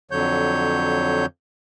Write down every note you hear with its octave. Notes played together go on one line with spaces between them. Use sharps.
F2 D3 F#3 C#5 G6